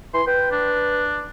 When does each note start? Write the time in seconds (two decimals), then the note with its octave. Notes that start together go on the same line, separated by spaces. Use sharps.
0.14 E3 C6
0.27 B4 G5
0.52 D4